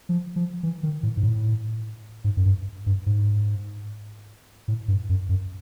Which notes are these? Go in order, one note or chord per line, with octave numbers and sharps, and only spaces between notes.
F3
F3
E3
D#3
A2
G#2
A2
G#2
F#2
G2
G2
G#2
A2
G2
F#2
F#2